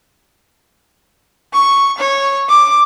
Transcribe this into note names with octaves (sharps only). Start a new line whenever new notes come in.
C#6
C#5
D6